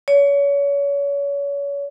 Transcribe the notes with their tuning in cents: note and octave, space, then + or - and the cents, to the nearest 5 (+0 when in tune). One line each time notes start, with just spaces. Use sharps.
C#5 +30